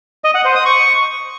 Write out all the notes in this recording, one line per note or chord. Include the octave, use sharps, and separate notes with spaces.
D#5
F#5
C5
D#6
C#6